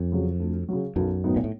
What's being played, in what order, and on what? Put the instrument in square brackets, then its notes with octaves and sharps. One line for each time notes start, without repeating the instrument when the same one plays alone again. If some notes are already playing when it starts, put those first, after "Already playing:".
Already playing: [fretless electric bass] F2
[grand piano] C#3 F#3
D2
C#3 F#3
[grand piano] B1 [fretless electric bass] F#2
[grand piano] A2 F#3 B3 D#4
[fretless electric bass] A#2
A2